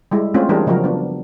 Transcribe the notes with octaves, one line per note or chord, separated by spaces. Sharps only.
G3 G#3 E4
G#3 A3 C4 C#4 F4
E3 G3 D4 G4 G#4 A#4
C#3 F3 F#3 F#4 A#4
B3 D4